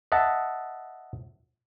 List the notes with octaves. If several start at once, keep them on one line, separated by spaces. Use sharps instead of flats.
D#5 E5 F#5 A5